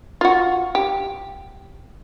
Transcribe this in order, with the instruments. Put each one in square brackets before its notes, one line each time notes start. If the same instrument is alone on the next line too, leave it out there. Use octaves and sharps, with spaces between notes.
[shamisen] F4 F#4
G4